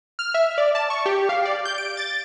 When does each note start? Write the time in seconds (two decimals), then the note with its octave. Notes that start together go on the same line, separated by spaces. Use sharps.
0.19 F6
0.34 E5
0.58 D5
0.75 A5
0.90 C#6
1.06 G4
1.29 F5
1.45 D5
1.65 G6
1.78 D7
1.97 A6